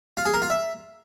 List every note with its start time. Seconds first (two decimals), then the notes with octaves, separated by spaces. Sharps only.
0.17 F4
0.25 G#4
0.34 A#4
0.42 F4
0.50 E5